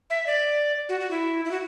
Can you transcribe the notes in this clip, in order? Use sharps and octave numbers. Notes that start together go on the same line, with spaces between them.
E5
D5
F#4
F#4
E4
E4
F#4